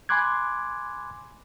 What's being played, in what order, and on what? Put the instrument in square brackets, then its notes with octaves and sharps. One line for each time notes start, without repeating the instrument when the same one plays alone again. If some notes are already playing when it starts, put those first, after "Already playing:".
[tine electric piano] G#5 B5 C6 D6 F#6 G#6